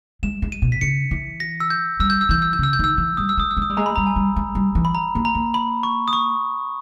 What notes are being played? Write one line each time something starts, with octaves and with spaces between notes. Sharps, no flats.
G#3 E7
G#3
D#7
B2
B6
C#3 C#7
E3
A#6
E6
G6
G3 E6
G6
E6
E3 G6
E6
G6
C#3 E6
G6
D#3 E6
E3
G3 D#6
E6
G#3 D#6
E6
G#3
D#6
G3
G#3 A#5
B5
G3 A#5
G#5
G3
G#3
G3
E3
B5
A#5
A#3
A#5
A#3
B5
C#6
D#6
C#6